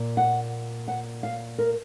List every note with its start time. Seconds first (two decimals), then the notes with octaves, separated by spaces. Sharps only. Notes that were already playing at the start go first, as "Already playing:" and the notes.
Already playing: A#2
0.17 F#5
0.88 F#5
1.23 F5
1.58 A#4